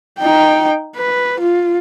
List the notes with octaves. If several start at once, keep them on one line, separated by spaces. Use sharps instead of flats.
D#4 G5
B4
F4